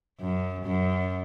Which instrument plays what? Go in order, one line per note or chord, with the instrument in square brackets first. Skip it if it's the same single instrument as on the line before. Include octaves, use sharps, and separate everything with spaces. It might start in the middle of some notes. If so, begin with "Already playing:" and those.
[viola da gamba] F#2
F#2